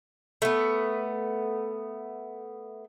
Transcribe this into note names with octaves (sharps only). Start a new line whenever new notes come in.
A3 B3